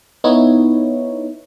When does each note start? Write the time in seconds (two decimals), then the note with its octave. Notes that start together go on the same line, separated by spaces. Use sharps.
0.24 B3 D#4 E4 C#5